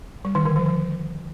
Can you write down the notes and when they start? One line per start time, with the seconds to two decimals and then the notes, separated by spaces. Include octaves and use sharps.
0.25 G3
0.35 D#3
0.45 D3
0.56 F3
0.66 F3